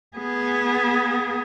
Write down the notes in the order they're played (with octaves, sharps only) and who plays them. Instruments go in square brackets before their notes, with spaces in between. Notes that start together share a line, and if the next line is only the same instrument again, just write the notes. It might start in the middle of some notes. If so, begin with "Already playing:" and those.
[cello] B3 G#4